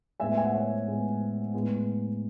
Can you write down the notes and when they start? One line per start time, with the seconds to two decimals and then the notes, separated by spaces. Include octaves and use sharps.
0.20 A2 G#3 B3 E5 G#5
0.37 G#5
0.45 F#5
0.53 C#5 E5
0.87 A2 G#3 B3
1.54 A2 G#3 B3